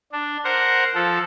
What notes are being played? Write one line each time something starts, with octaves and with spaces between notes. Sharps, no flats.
D4
A#4 C5 F#5
F3 A4